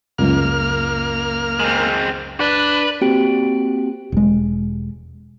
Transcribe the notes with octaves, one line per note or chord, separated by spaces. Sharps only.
C#2 F#2 A#3 F6
G#3 C4
D4 B4
A#3 C4 F#4 G4 G5 D7
E1 G#3